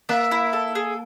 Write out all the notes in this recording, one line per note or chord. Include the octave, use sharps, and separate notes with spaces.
A#3 E5
E4
A4
G#4